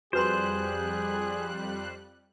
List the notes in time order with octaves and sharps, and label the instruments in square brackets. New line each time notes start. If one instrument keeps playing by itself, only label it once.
[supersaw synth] F2 G3 F#6 [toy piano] F#4 B4 B5 [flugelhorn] G#4 [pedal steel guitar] C5